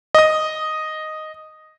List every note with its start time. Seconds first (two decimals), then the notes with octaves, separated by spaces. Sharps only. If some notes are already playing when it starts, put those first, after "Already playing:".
0.15 D#5 D#6